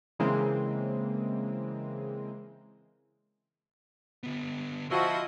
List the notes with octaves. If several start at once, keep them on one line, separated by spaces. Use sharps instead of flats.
C#3 E3 G#3 A#3 C4
D3 B3
F3 E4 F#4 D#5